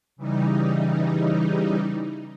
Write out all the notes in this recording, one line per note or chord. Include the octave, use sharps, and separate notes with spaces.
C#3 E3 G3 D#4